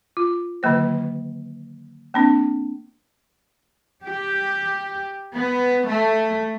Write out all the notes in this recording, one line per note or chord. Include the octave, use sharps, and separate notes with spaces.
F4
D3 D#3 F#3 A#3 C5
A#3 C4 D4
G4
B3
A3